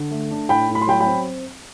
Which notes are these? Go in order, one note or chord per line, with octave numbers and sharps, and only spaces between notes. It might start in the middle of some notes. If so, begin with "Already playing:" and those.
Already playing: D3
A3
D4
A2 G5 B5
A2
B5
C6
F#3 G5 B5
G5 B5
C4